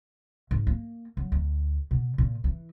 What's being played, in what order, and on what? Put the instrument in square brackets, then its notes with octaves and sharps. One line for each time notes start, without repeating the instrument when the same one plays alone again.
[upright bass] G#2
A#3
F#2
D2
B2
A#2
E3